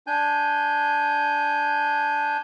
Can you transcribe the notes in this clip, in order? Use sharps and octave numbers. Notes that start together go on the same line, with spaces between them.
D4 G#5 G6